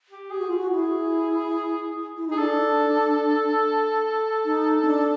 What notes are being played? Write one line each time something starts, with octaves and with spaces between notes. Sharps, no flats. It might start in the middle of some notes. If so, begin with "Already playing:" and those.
G4
G4 G#4
F#4
F4
F#4
E4 G#4
E4
D#4 G#4
D4 A4
D#4
C#4
D4